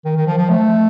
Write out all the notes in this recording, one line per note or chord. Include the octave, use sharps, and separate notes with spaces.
D#3
D#3
F3
F3
A3